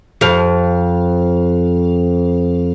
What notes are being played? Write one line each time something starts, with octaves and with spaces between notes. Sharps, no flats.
F2 F5